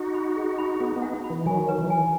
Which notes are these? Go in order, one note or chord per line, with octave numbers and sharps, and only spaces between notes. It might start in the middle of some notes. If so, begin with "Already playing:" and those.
Already playing: D#4 F#4
B5
G#4
B5
B3 D#4 G#4
B3 D#4
F#5
B5
E3
D#3 F#3 G#5
B4
E3
G#5